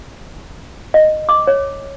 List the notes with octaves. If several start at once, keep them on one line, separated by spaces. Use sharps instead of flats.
D#5
D6
C#5